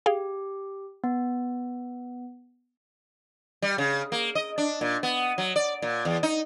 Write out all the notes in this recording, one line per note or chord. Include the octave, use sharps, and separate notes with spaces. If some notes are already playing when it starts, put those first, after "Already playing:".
G4 G#4 F5 G5
B3
G3
C#3
A#3
D#5
D4
A#2
B3
F#3
D5
A#2
E2
D#4